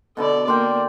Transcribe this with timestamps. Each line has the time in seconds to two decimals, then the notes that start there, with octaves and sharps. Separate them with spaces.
0.17 B2 D3 A4 D5 B5
0.48 A#3 D5 G5 C6